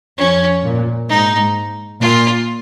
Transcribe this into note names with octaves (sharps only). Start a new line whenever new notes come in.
F2 C#4
A#2
G#2 D#4
A#2 F4